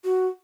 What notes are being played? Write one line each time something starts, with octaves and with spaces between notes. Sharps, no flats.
F#4